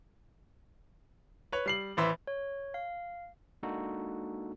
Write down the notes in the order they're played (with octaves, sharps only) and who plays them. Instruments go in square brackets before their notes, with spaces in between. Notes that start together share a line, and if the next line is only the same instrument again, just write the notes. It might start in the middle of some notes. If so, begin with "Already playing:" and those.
[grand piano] B4 C#5
G3 C7 F#7
A1 E3 C5 E5 B5
[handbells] C#5
F5
[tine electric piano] G#3 A#3 D4 D#4 F#4 A4